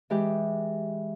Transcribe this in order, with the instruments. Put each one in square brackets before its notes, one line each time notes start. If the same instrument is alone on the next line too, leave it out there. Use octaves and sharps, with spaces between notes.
[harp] E3 G#3 G4